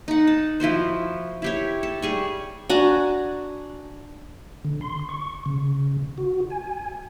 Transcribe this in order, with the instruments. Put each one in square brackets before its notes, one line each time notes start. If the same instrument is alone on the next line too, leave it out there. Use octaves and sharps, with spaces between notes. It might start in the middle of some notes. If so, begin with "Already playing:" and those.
[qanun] D#4 F#5
A5
F3 E4 F#4 C5
E4 G4 C#5
A4
G3 G#4 C#6
D4 F#4 G#5 A#5
[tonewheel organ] D3
C6
C#6
C#3
F#4
G#5